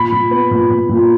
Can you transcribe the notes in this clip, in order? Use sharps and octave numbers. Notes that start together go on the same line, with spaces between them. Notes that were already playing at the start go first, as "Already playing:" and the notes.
Already playing: A#2 B5
A#2
B3
A#2
A#2
A#2